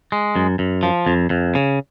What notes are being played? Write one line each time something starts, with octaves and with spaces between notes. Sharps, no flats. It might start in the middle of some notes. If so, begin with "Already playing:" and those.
G#3
F#2
F#2
F3
F2
F2
C#3